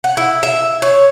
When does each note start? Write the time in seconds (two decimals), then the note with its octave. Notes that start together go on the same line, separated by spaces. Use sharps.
0.04 F#5
0.17 E4
0.43 E5
0.82 C#5